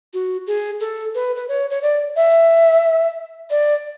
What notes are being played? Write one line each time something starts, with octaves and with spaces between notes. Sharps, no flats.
F#4
G#4
A4
B4
B4
C#5
C#5
D5
E5
D5